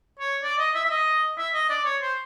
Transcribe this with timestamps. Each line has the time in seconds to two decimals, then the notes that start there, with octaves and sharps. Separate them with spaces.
0.19 C#5
0.43 D5
0.59 D#5
0.75 E5
0.85 E5
0.90 D#5
1.38 E5
1.54 D#5
1.70 D5
1.85 C#5
2.02 C5